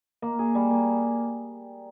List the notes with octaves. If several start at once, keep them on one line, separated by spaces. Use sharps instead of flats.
A#3
G#4
G3
A#3